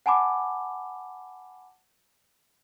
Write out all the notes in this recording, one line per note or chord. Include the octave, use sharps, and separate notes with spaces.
F#5 G#5 A5 B5 D6